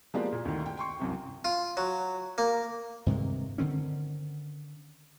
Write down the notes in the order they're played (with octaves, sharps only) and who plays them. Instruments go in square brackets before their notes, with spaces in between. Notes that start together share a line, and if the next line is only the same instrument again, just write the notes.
[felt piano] F3 G#3 A#3 B3 G4 D5
A#2
D2 D#3
G5
G5 C6 C#6
C2 F#2 C3
[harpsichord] F4
F#3
A#3
[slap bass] G2 C3 D#3 G#3
D3 D#3 C4 C#4